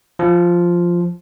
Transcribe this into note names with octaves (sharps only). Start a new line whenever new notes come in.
F3